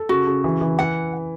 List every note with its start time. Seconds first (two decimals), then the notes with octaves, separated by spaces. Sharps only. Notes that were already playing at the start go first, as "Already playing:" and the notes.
Already playing: A4
0.09 C#3 F#4
0.27 C#3
0.44 E3
0.61 E3
0.78 E3 F#5